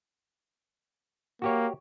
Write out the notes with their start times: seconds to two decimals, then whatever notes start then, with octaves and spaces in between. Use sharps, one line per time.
1.42 A#3 F#4 G4 C#5